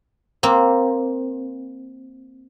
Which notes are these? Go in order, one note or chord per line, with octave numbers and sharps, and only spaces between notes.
A#3 C4